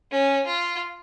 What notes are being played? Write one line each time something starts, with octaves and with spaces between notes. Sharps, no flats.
C#4
F4